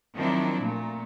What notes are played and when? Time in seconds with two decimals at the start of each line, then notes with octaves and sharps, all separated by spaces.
0.15 D#3 F3 F#3 C4 D4 E4
0.60 A#2 A3